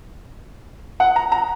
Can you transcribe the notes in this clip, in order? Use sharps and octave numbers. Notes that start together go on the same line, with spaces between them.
F#5
A#5
A#5